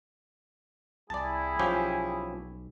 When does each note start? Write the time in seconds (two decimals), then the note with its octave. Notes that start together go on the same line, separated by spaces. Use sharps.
1.10 C2 G3 E4 G#4 D5 A5
1.59 B1 F3 C#4 G4